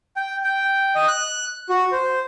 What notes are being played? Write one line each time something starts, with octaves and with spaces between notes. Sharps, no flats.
G5
G5
D#5
F#6
F#4
C5